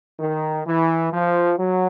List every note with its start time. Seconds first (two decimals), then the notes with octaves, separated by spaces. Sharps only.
0.19 D#3
0.66 E3
1.12 F3
1.59 F#3